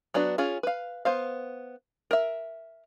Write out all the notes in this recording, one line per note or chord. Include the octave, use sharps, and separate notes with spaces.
F#3 B3 D4 F#4
C#4 F4 G#4
B4 F5
B3 C5 F5
A#4 E5